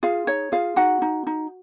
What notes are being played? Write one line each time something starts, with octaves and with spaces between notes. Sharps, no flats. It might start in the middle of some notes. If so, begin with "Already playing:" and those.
F4 G#4 F5
D#4 C#5
F4 G#4 F5
D#4 F#4 F#5
D#4
D#4